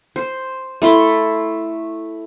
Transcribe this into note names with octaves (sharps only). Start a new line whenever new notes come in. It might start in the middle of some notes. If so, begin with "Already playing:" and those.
C5
A3 E4 C6